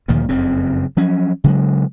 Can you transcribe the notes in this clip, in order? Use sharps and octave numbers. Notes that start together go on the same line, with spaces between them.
D2 A#2 D#3 F3
F#1 F2 C#3 C4
F3 F#3 C#4
C#3 F#3 G#3